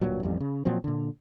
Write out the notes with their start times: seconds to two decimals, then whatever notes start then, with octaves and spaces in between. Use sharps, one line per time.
0.01 D1 G2 A#2 F#3
0.23 A1 F2 G3
0.40 C#3
0.65 A#2 F3 F#3 C4
0.84 A#2 D3